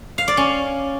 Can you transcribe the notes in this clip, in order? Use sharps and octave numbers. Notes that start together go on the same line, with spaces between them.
F5
D5
C#4